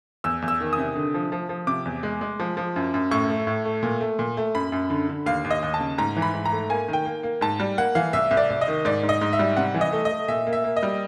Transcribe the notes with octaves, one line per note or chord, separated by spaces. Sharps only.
E2 E6
E2
E6
D#3
D#6
C3
D3
F3
F3
F3
C3 D6
E2
G#3
G#3
F3
F3
F#2
F#2
A2 C#6
A3
A2
A3
A#2
A3
A#2
A3
F#2 B5
F#2
D3
D3
D#2 F5
D#2
D#5
D#2
A5
C#3
G#2 A#5
E3
B5
G#2
A#5
A3
A#3 G#5
D#3 G5
A#3
A#3
G#2 A5
G3
A#3 F#5
E3 F5
C2 E5
C2
D5
C2
D#5
D#3
G#2 D5
G#2
D#5
G#2
E5
G3
C3 F#5
E3
D#5
A3
D#5
A3
A#2 E5
A#3
E5
A#3
D#5
G3